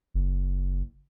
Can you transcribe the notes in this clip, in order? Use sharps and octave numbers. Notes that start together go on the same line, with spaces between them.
F#1